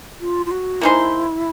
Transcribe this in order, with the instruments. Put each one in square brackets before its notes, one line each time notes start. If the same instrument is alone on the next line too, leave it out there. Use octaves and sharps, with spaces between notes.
[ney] F4
F4
F#4
[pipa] A#3 D#4 G#4 C5 [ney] E4